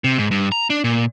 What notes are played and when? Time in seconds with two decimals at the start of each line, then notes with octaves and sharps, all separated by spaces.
0.04 C3
0.18 G#2
0.31 G2
0.52 A#5
0.70 D4
0.84 A#2